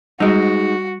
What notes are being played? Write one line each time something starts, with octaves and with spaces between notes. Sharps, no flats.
G3 G#3 D#4 F#4